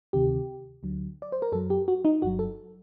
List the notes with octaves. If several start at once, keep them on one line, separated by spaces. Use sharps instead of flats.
D2 C3 D#3 G4
D2 D3 F#3
D5
C5
A#4
F#2 F#3 A4
G4
F#4
D#4
G1 G2 F#3 F#4
A4